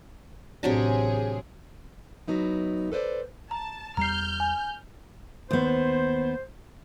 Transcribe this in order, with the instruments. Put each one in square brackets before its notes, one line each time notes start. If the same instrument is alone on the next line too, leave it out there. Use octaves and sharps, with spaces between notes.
[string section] A1 G#4 [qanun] C3 F#3 D4
[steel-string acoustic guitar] F#3 B3 D#4 E4
A4 B4 C5 D5
[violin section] A5 [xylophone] A#5
[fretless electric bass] E2 G3 [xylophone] A#5 C7 [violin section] F6 G6
[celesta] G#5
[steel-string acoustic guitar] D#2 B3 [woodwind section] C5